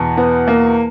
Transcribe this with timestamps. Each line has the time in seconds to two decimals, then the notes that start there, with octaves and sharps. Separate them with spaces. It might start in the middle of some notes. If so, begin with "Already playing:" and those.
Already playing: E2 B2
0.17 B3
0.48 A#3